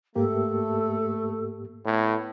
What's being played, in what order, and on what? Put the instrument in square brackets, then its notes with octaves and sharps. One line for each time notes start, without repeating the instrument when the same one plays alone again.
[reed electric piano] G#2 A#3 G4 [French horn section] A3 [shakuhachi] A4
[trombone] A2 [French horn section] A3 B3